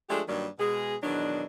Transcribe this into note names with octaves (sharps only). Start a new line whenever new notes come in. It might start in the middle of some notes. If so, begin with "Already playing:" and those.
F3 G#3 A3 D4 G4 G#4
G2 D#3 F#3 G3 A#3 D5
B2 G#3 G#4
E2 B2 D#3 F#3 D4